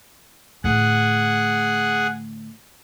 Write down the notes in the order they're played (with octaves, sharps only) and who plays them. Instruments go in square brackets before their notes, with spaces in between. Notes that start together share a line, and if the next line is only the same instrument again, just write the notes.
[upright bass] A2 D3 [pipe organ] G#4 F#5